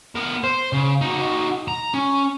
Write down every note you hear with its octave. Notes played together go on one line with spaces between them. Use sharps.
B3 A#4
C5
C#3
D#4 F#4
A#5
C#4